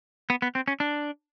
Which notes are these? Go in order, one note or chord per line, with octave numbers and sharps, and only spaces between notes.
B3
B3
C4
C#4
D4